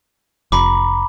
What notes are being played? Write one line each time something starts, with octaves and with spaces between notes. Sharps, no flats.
F1 A#5 B5 D6